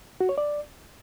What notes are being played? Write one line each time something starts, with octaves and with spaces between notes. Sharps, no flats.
F#4
C#5
D5